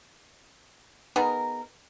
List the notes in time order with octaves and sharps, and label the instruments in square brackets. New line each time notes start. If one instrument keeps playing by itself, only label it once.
[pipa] B3 D#4 G#4 A#4